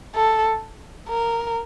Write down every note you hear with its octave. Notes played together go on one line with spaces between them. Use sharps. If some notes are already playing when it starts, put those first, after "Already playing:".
A4
A#4